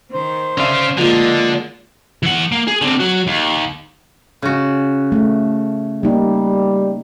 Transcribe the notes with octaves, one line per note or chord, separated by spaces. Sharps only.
D#3 C5
C#4 D5 E5 F5 C6
D3 D#3 F3 G#3 A#3 F4
E3 F#5
A#3
G#4
D3 C4
F#3 F#4
D#2
C#3 F#4
A3
G3 A#3 D#4